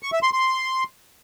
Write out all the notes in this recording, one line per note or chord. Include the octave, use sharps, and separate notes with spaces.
C#6
E5
C6
C6